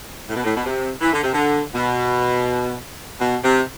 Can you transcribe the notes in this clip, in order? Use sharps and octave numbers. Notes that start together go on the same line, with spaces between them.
A2
B2
A2
B2
C3
E3
D3
C3
D3
B2
B2
C3